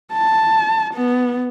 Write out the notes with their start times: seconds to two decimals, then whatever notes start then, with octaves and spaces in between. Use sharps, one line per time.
0.12 A5
0.94 B3